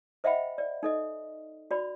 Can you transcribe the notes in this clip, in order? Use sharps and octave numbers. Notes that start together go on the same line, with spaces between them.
C5 D#5 E5 F#5 G5 B5
D5
D#4 A4 D#5
F#4 D5 B5